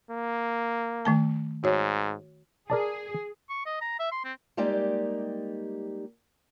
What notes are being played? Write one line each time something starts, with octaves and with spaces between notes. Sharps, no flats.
A#3
D#3 A3 A5
G#2 F#4 C#5
G#4 A#4 D5 A5
C#6
D#5
A#5
E5
C6
C4
G3 G#3 A#3 D#4 G4 D5